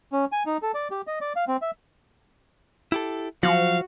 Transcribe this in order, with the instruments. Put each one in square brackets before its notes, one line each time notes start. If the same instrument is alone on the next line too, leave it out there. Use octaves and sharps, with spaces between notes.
[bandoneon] C#4
G#5
D#4
A4
D5
G4
D#5
D5
F5
C4
E5
[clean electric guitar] E4 G4 A4
[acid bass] F3 [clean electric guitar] F#3 [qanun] F#4 [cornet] F5